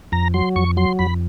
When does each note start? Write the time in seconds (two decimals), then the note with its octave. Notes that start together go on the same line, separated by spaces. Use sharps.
0.12 F2 A#5
0.34 F#3 C6
0.56 F2 C#6
0.77 F#3 C6
0.99 F2 B5